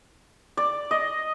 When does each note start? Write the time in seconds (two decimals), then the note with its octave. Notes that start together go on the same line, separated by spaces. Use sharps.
0.57 D5
0.91 D#5